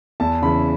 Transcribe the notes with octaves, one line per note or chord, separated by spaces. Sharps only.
E2 A5
C#3 E3 B5